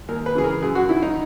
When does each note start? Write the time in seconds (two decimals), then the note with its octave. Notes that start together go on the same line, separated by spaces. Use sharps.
0.08 D#2 A#4
0.26 B4
0.35 C#3 E3 G#4
0.44 A#4
0.62 F#2 G#4
0.75 F#4
0.89 D#3 E4
1.02 D#4